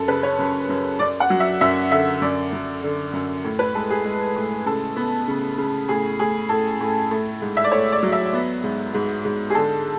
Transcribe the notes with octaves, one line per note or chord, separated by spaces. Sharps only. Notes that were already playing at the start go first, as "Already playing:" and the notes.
Already playing: F#2 A4
C#3 B4
C#5
F#2
F#2
F#2 D5
F#5
F#3
E5
F#2 E5
D3 E5
F#2 D5
F#2
D3
F#2
A2
B4
G#3 A4
G#4
G#3
A2
C#3 A4
B3
C#3
C#3
A2 G#4
A2 G#4
A2 A4
A2
A3
G#2
E5
D5
A3 C#5
D5
F#3
E5
B3
G#2
G#2
G#2
G#4
D3 A4